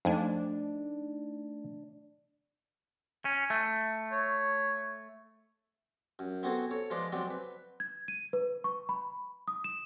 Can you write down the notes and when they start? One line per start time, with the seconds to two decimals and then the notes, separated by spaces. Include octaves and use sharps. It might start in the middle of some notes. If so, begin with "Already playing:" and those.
0.05 F2 A3 D4 D#4 G#5
3.25 C#4
3.50 A3
4.12 C#5
6.19 F#2
6.43 B3 C4 F#4 G#4 A4
6.71 A4 C#5
6.90 F3 G#3 F4 B4 D5 D#5
7.12 F#3 G#3 C4 D5
7.30 B4
7.80 G#6
8.08 D#7
8.33 B4
8.64 C#6
8.89 B5
9.48 D#6
9.64 E7